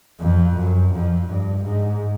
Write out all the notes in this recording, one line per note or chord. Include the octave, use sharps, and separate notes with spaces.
F2
F#2
F2
G2
G#2